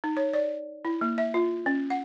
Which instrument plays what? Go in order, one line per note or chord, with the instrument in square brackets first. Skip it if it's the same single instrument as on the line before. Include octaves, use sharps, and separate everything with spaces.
[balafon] D#4
C#5
D5
E4
A#3
E5
F4
C#4
F#5